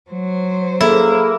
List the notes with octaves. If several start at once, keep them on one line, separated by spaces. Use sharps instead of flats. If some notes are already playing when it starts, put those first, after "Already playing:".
F#3 C5
A#3 E4 G#4 A4